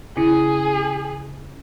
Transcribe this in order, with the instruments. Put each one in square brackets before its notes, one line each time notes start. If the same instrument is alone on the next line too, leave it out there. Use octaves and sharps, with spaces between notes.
[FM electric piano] C#3 [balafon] E4 [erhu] G#4